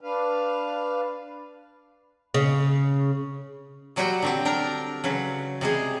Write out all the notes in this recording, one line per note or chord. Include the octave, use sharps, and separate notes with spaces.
D4 B4 F5
C#3
A#2 F#3 G3 F#4 G4 G5
D3 C4 G4
D4 A#4 G5 A#5
C#3 F#3 B4
C3 G3 G#3 G#4